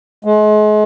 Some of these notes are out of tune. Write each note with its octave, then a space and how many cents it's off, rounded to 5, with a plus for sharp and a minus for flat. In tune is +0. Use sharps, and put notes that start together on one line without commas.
G#3 +35